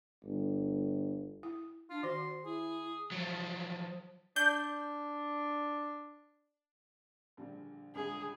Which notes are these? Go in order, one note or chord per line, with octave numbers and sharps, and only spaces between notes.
G1
E4
D4 F4
D#3 F#4 C5 C6
E4 G#4
F3 F#3
D4 G6
A#1 D3 G3
D#1 C#2 D3 G#4